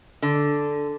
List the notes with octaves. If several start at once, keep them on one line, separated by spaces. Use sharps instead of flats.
D3